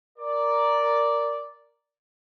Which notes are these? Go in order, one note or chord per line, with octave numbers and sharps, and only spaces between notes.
A#4 D5